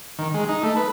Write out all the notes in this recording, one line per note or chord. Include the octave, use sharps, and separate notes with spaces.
D#3
G#3
D#4
A3
B4